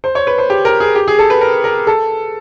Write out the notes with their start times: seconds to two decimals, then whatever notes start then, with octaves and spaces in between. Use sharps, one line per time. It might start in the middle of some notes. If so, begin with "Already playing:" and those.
0.04 C5
0.15 C#5
0.27 B4
0.38 C5
0.50 G4
0.65 A#4
0.80 G#4
0.95 G4
1.08 G#4
1.19 A4
1.30 B4
1.41 A#4
1.64 A#4
1.87 A4